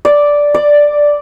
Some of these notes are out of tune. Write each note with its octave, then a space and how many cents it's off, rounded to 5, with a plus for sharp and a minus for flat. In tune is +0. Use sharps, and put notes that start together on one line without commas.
D5 -5
D5 +5